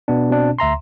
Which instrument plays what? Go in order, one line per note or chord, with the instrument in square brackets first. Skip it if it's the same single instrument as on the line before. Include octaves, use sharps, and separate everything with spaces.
[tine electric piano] B2 B3 D4
B2 C4 D4
D2 E5 A#5 C6